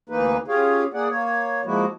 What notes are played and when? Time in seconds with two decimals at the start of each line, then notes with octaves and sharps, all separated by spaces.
0.09 D2 E3 A#3 D#4 B4
0.48 C#4 F4 G4 G#4 C#5 F5
0.94 A#3 G#4 D5 F#5
1.10 A#3 C#5
1.65 F3 G#3 A#3 E4 F#4